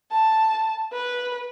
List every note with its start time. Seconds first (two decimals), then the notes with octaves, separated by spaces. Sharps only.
0.11 A5
0.93 B4